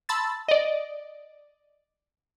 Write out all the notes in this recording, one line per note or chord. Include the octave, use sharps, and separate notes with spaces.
A5 B5 C6 E6 A6
D5 D#5